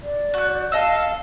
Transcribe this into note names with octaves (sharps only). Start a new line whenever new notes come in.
D5
F#4 G6
A4 D#5 F5 E6